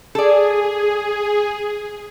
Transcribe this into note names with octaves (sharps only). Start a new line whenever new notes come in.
G#4 A4 D5